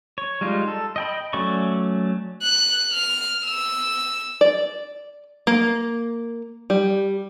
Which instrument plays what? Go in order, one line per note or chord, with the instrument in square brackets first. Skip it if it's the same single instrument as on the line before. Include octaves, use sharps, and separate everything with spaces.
[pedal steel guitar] C#5
G3 G#3 D#4 F4
A4
D#5 G5 B5
F#3 A3 C#4 D5 C#6
[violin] F#6
F6
E6
[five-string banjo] D5
A#3
G3